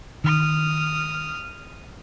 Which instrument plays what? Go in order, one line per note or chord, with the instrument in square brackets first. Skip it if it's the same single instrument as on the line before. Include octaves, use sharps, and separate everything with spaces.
[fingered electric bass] D#3 [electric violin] D#6 F6